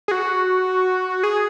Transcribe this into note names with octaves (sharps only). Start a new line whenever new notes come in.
G#4
F#4
G#4